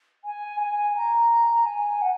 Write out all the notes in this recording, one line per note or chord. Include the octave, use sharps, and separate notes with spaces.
G#5
G#5
A#5
G#5
F#5